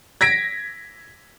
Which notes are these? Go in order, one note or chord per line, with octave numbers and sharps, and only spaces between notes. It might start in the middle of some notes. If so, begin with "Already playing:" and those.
G#6 A#6 B6 D7